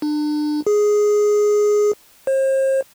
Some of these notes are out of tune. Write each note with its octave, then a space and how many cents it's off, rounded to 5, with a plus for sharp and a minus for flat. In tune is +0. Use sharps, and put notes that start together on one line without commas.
D4 +35
G#4 +5
C5 +40